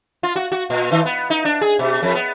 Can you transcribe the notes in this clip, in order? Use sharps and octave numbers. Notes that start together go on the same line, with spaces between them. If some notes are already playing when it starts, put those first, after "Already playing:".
F4
F#4
F#4
A#2
D#3
B3
D#4
D4
G#4
B2
F2
B3